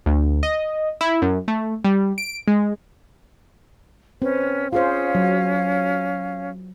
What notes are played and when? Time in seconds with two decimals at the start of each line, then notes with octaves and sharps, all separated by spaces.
0.06 D2
0.43 D#5
1.01 E4
1.22 F#2
1.48 A3
1.84 G3
2.18 D7
2.48 G#3
4.22 C4 C#4 B4
4.73 C#4 F4 G#4 C5 F5
5.15 F#3